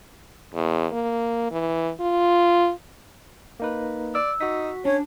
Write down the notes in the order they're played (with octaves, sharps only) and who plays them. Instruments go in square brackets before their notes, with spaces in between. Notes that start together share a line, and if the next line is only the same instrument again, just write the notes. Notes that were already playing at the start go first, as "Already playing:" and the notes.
[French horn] E2
A#3
E3
F4
[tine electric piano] A#3 D#4 B4
[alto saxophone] D5 [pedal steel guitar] E6
[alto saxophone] D#4 [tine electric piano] F#4 B6
[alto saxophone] C#4 [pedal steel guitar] D4 [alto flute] C#5